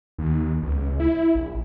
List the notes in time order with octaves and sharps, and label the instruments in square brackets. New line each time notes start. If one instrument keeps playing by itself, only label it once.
[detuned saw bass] D#2
C#2
E4
A#1